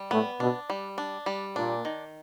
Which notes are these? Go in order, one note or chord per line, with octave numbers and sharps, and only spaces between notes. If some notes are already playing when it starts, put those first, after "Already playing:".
Already playing: G3
A2 B3
B2 D4
G3
D4
G3
A#2 D4
D#3